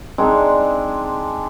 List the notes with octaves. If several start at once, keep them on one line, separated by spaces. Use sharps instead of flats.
G#3 C4 D4 D#4